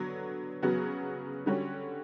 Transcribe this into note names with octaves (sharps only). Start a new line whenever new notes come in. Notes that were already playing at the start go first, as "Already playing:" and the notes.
Already playing: D3 F#3 B3 F#4
C#3 F#3 B3 F#4
D3 G3 C#4 F#4 C#5